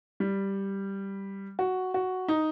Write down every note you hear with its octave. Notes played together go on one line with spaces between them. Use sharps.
G3
F#4
F#4
D#4